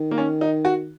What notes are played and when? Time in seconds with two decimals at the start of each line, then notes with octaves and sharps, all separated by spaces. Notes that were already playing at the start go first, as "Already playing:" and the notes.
Already playing: D#3
0.11 A#3
0.18 C#4
0.41 D#4
0.65 F#4